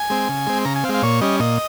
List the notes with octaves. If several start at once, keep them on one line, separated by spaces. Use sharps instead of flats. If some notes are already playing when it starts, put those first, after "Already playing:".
Already playing: G#5
G#3 C4
C#3
G#3 C4
C#3 A#5
G#5
C4 F5
G#3
F5
A#2 C#5
G3 C#4 D#5
A#2 D#5